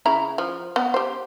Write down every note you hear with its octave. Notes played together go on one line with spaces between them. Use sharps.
C#3 E4 A#5
F3
B3
G4 C5